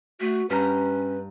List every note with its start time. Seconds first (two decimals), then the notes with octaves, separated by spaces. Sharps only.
0.20 A3 F#4 F#6
0.50 G2 C#4 G4 B4 A#5